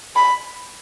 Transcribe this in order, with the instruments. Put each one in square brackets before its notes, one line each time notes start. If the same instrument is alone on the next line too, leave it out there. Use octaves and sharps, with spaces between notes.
[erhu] B5